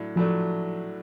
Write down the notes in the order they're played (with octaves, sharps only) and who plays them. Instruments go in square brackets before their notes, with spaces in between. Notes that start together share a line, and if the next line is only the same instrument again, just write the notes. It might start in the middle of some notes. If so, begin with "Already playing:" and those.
Already playing: [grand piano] A2 F#3 D4
[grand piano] A2 F#3 A3 D4 [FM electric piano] F3